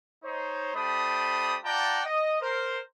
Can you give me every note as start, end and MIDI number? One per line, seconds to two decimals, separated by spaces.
0.24 0.71 63
0.24 0.71 72
0.24 0.71 73
0.75 1.58 57
0.75 1.58 62
0.75 1.58 67
0.75 1.58 72
0.75 1.58 83
0.75 1.58 87
1.64 2.01 65
1.64 2.01 74
1.64 2.01 78
1.64 2.01 79
1.64 2.01 81
1.64 2.01 82
2.05 2.41 75
2.41 2.79 70
2.41 2.79 72